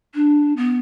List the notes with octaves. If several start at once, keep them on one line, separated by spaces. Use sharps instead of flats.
D4
B3